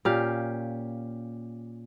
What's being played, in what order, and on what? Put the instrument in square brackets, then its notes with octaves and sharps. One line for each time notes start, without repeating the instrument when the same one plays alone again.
[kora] A#2 C#4 G4 F5